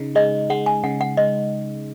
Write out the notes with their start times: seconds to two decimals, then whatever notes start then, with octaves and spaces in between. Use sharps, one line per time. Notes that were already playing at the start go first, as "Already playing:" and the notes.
Already playing: C#3 D#4
0.15 G#3 D#5
0.50 G#3 F#5
0.66 G#5
0.84 C#3 F#5
1.01 F#5
1.17 G#3 D#5